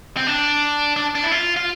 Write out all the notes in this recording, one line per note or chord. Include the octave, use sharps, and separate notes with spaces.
C4
D4
D4
D4
E4
F4
F4